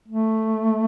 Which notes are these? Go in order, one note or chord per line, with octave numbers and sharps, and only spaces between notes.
A3